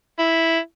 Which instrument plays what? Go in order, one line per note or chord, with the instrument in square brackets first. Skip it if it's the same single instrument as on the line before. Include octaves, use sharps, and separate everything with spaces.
[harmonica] E4